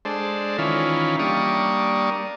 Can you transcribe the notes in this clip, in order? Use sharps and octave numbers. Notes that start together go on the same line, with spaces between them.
G#3 D4 A4 C5
D#3 E3 C#4 F4 B5
G3 A#3 D4 C#6 D#6